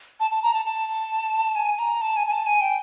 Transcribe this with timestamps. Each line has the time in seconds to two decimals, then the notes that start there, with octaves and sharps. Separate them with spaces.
0.20 A5
0.31 A5
0.43 A#5
0.54 A5
0.66 A5
1.55 G#5
1.79 A#5
2.01 A5
2.17 G#5
2.27 G#5
2.32 A5
2.46 G#5
2.61 G5